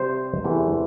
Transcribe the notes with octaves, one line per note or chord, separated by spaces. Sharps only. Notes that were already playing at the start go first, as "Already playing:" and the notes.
Already playing: C3 G3 C4 C5
E2 C3 E3 A3